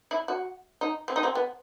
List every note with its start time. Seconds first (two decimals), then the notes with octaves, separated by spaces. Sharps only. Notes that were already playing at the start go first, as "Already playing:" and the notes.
0.11 E4
0.28 F#4
0.81 D#4
1.08 C4
1.16 D#4
1.23 C4
1.35 B3